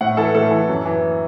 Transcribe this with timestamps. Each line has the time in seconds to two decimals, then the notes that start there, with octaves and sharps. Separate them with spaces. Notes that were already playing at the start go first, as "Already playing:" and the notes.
0.01 A2 F#5
0.17 E3 A4
0.34 A2 A4
0.51 E3
0.69 F#2
0.86 E3